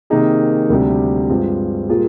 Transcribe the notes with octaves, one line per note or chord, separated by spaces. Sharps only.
C3 D#3 A#3 D#4 G#4
D2 C3 G3 D4
G2 F3 G#3 C4 F4
A#2 G3 A#3 F4 G#4